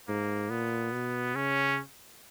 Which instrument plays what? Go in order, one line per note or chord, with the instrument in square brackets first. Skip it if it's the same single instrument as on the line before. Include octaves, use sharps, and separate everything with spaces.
[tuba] G#2 [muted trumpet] A#3
[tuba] A#2 [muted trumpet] B3
[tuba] B2
[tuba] C#3 [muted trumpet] C#4